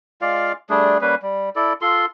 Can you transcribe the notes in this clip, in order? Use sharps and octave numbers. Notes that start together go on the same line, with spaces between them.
G#3 F4 D5 F5
G3 A3 D4 G#4
G3 A#3 C#4 B4
G3
E4 A4 D5
F4 A4 C6